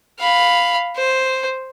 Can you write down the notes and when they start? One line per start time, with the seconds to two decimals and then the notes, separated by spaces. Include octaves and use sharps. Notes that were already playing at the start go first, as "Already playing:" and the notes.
0.19 F5 B5
0.96 C5